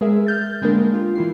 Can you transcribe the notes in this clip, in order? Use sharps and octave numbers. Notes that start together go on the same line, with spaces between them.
G#3 G#4 A#4 E5
F6 G6 A6
D3 G3 G#3 A#3 D4 A#4
F4 G4
E3 E4 C7